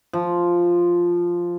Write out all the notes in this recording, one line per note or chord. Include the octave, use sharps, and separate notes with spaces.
F3